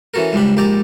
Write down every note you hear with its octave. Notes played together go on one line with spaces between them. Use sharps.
E3 C#4 F#4 A4 A#4
C#2 G#2 G3 D4 B5
A#1 G#2 G4 D5 A#5